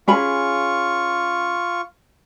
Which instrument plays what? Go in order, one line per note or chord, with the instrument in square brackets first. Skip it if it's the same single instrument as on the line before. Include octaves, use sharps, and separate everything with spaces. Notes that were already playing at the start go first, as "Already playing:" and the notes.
[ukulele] C#4 G#4 B5 [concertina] F4 C#6